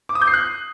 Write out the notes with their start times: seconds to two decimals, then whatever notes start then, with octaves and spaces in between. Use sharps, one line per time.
0.09 D6
0.15 D#6
0.21 G6
0.28 C7
0.34 F#6